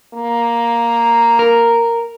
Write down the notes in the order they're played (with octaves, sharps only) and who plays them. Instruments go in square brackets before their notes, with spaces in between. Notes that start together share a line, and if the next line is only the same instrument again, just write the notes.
[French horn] A#3
[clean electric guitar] A#4